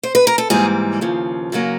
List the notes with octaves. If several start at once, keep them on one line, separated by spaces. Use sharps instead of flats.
C5
B4
A#4
A4
G#2 E3 G3 A#3 G#4
D#2 C#3 F3
F#2 C#3 F#3 A#3